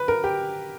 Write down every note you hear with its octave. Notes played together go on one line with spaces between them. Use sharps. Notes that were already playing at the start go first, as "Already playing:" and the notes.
Already playing: B4
A#4
G4